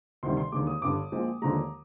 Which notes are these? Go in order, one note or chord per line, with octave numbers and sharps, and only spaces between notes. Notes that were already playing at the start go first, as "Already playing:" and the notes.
D2 C3 D#3 G3 C6
C6
D#2 D3 G#3 D6
D#6
G1 G2 D3 D6
A#1 A#2 F3 G#3
D#2 D3 F3 G#3 A#5